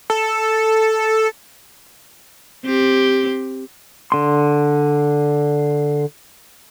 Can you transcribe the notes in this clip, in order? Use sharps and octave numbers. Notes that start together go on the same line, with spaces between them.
A4
C4 G4
D3 C6